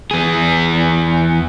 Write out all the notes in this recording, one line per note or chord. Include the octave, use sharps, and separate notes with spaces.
E2 G#4